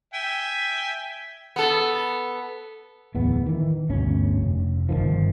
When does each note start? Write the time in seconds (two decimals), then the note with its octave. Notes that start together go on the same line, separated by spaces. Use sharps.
0.14 E5 G5 G#5
1.56 B3 A4
3.15 D1 E2 B3
3.46 D#3 E3
3.90 G1 D2 B2 C#4
4.42 F1
4.89 G1 D2 D#3 F3